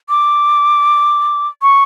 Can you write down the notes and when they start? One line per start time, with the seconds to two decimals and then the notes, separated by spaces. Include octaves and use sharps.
0.09 D6
1.62 C#6